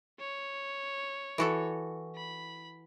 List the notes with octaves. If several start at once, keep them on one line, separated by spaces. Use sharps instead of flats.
C#5
E3 F#4 A4
B5